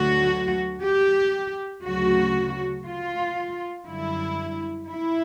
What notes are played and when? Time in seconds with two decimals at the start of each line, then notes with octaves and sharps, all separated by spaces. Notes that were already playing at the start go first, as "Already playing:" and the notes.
Already playing: D2 D3 F#3 A3 F#4
0.82 G4
1.83 D2 C#3 F#3 A3 F#4
2.85 F4
3.86 F#2 D3 G3 E4
4.88 E4